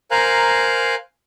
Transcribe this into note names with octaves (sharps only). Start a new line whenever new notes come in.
A#4 C5 F5 G#5 A#5 F#6